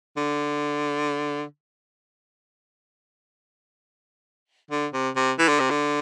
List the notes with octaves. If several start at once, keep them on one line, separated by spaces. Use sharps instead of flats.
D3
D3
C3
C3
E3
D3
C3
D3